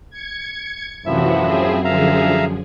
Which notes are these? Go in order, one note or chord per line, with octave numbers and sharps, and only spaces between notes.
G#6 C#7
F#2 A2 C3 E3 F3 F#4 E5
C4 G#4
D3 F3 G#4 E5 F5 A#5